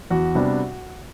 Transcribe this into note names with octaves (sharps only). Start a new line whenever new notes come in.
E2 F#4
C3 G3 B3 D4